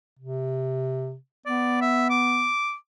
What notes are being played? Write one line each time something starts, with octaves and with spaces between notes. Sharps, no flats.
C3
B3 D5
E5
D6